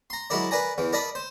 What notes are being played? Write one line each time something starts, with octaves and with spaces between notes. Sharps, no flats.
A#5 C6
F#3 G#3 E4 A#4 D5
A#4 B4 D5 G#5 A#5
E2 E3
A#4 D5 D#5 A5 B5
C5